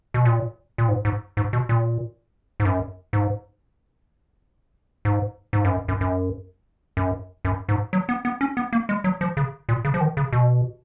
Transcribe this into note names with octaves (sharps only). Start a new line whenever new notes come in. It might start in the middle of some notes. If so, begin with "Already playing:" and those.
B2
A#2
A#2
G#2
G#2
G#2
B2
A#2
G#2
F#2
G#2
G#2
G#2
F#2
F#2
F#2
F#2
F#2
G#2
F#3
B3
B3
C#4
B3
A#3
G#3
F#3
F3
C#3
A#2
C#3
F3
D#3
C#3
B2